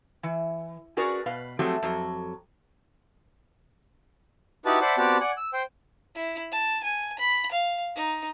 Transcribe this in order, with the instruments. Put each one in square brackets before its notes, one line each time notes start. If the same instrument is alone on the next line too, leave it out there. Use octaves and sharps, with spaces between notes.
[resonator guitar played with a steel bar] E3
C#4 F#4 G#4 A#4 B4 D5
B2 B4 F5
F3 F#3 A3 C4 G4 G#4
F2 F#3
[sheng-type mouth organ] D#4 E4 F#4 G4 B4 A5
C5 D5 E5 F#5 A5 B5
B3 C4 F#4 G4 D5 A5
D5 F#5 G#5
E6
C5 G5
[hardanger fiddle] E4
A5
G#5
B5
F5
D#4